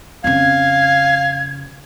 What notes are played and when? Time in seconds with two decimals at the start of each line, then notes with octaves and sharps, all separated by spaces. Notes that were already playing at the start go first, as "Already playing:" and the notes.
0.24 F2 C#3 F5 G#6